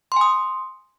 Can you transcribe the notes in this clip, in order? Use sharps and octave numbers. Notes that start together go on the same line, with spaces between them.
G#5 C6 D#6